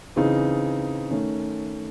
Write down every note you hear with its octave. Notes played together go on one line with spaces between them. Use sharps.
C#3 E3 C4 D#4 G#4
D#3 A3 C#4